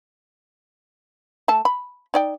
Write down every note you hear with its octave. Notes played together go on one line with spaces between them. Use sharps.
A3 A4 A5
B5
D#4 D5 G5